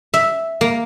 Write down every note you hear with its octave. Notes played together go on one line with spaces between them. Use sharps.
E5
A#3